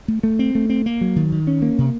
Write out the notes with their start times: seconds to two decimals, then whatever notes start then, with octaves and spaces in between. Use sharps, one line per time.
0.08 A3
0.23 A3
0.39 C4
0.55 A3
0.70 C4
0.86 A#3
1.01 F#3
1.16 D#3
1.32 D#3
1.47 C#4
1.62 A#3
1.78 C3